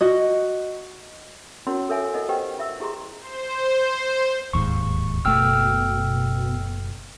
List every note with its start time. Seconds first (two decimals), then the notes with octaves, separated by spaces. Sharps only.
0.01 F#4 D#5
1.67 C#4 E4 F#4 A#4 C#5 C6
1.89 A4 A#4 C#5 E5 G#5
2.14 E4 A4 A#4 D#5 F#5
2.29 G4 B4 C5 D#5 F#5 G5
2.58 F4 E5 E6
2.80 E4 G4 G#4 A#5 C6
3.20 C5
4.53 D1 D#2 G#2 C#6
5.25 F#1 B2 A3 G5 E6 F6